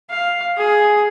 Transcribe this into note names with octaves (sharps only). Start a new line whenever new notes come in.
F5
G#4